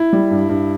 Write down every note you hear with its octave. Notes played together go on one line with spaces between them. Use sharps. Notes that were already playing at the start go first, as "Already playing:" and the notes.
Already playing: E4
G3
G2
G2